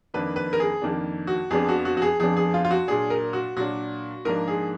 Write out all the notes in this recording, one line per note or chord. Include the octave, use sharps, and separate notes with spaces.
F2 D#3 A#3 D4 B4
B4
A#4
G#4
F2 D#3 A#3 D4
F#4
F2 F3 B3 D4 G#4
F#4
F#4
F#4
G#4
F2 F3 B3 D4 G#4
G#4
F4
F4
F#4
A#2 F#3 D4 G#4
A#4
F#4
A#2 F#3 D4 F#4
G#2 F3 A#3 D4 A#4
G#4